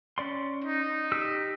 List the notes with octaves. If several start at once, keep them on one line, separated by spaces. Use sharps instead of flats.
C#4 D5 C6
D#4
G4 E6